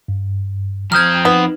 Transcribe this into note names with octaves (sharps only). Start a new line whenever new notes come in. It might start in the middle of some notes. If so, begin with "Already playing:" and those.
G2
F2 C4 A#5 D#6 F6 G6 G#6
B3 D#4